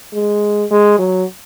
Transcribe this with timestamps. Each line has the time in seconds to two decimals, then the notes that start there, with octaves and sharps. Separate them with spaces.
0.13 G#3
0.71 G#3
0.99 F#3